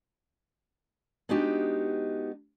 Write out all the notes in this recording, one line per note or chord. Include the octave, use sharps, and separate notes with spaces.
G#3 B3 D4 D#4 F#4 G4